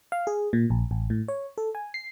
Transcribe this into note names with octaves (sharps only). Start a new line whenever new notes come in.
F5
G#4
A#2
A#1
A1
A2
C#5
A4
G#5
C7